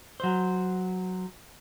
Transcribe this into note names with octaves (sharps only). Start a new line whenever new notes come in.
F#3 C5